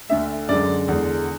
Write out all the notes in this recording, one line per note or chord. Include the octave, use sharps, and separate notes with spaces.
D2 D3 A3 E5
F#2 D3 G#3 D5
E2 D3 G#3